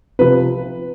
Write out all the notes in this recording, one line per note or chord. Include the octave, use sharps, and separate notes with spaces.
C3 F3 B4